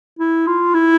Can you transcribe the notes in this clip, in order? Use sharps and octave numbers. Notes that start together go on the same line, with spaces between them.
E4
F4
E4